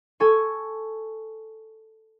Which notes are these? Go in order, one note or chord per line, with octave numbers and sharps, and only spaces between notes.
A4 G#5 C#6